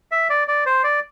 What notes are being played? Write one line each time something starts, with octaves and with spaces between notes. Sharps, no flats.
E5
D5
D5
C5
D5